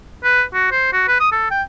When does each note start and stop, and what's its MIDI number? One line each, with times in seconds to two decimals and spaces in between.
0.24 0.43 71
0.54 0.68 66
0.72 0.90 72
0.93 1.04 66
1.08 1.19 71
1.20 1.30 87
1.32 1.47 69
1.51 1.62 79